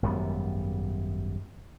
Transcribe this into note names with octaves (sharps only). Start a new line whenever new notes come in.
G#1 F#2 G3 B3